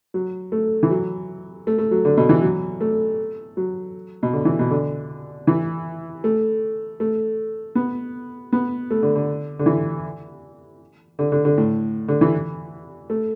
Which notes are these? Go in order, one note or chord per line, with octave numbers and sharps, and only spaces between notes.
F#3
A3
E3
F#3
A3
A3
F#3
D3
B2
E3
F#3
A3
F#3
B2
D3
E3
B2
D3
E3
A3
A3
B3
B3
A3
D3
D3
D3
E3
D3
D3
D3
A2
D3
E3
A3